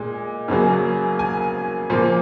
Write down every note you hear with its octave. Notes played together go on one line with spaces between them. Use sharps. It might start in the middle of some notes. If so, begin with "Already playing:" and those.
Already playing: A#2 G#3
F#2 C#3 F#3 A#3
G#5
A#2 F3 A#3